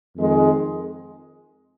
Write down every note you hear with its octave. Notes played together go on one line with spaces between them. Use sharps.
F2 D#3 G#3